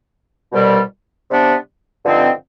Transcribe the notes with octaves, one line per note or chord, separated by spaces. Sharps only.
C2 B2 G3
C3 G3 B3 D4
G2 D3 F3 C4 D#4